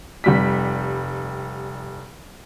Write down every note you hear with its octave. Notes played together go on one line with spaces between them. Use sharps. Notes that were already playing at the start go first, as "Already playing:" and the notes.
F1 G3 B6